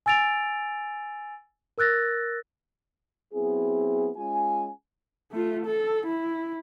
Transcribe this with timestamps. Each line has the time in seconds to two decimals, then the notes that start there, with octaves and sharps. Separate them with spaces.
0.06 G#5 E6 A6 D7 F7
1.78 A#4 E6 F#6 A6 A#6
3.34 F#3 B3 C4 E4 G#4
4.17 G#3 C#4 F4 G#4 G#5
5.32 A3 F4
5.66 A4
6.07 E4